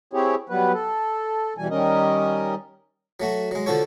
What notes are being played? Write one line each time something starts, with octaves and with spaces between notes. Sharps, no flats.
C4 E4 G4 G#4 C#5
F#3 G3 B3 B4
A4
E2 B2 E3 G3 G#5
D#3 G3 C#4 A#4 D#5
F#3 A3 F#4
F#3 G#3
D3 F3 F#4 A4 C#5